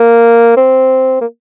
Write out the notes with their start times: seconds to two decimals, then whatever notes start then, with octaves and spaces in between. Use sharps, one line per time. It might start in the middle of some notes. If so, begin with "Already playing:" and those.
Already playing: A#3
0.57 C4
1.21 A#3